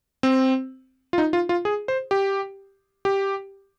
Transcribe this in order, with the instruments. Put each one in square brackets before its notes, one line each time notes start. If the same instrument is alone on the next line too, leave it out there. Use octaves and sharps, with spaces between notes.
[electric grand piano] C4
F4
D#4
F4
F4
G#4
C5
G4
G4